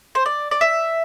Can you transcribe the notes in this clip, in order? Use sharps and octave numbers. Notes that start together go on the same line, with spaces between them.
C5
D5
D5
E5